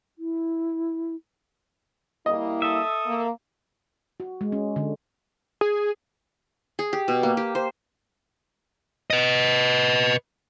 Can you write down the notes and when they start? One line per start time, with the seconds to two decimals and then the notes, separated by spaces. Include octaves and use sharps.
0.18 E4
2.26 G3 A#3 E4 D#5
2.62 A4 E5 D#6
3.06 A#3
4.20 F#4
4.41 G#3
4.52 C#4
4.76 D3
5.61 G#4
6.79 G#4
6.93 G4
7.08 B2
7.23 A#3
7.37 G4
7.55 C5
9.10 B4 D#5